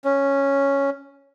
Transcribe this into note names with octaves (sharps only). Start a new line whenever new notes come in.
C#4